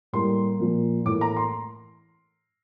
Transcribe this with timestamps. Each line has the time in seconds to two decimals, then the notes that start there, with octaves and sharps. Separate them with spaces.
0.13 A2 G3 A#3 C6
0.59 A#2 F3 A#3
1.05 A2 E3 A#3 D6
1.21 A#5
1.37 C6